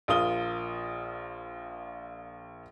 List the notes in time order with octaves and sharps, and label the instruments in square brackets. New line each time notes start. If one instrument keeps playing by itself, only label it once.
[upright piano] A#1 F4 A#4 D#6 G7